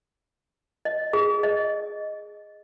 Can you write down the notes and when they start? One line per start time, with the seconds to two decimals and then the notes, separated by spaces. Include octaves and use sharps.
0.85 D#5
1.13 G#4
1.43 D#5